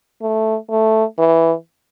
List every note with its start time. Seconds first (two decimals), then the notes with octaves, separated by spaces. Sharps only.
0.22 A3
0.70 A3
1.19 E3